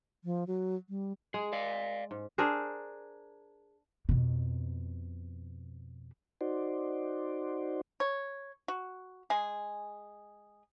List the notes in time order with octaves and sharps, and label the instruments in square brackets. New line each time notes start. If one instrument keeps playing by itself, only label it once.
[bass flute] F3
F#3
G3
[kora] G#3 [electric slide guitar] G#4
[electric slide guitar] D5 F5
[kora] G#2
D4 G#4 A#4 C5
[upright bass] F2 B2
[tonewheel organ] D#4 F#4 C5 D5
[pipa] C#5
F#4
G#3 G#4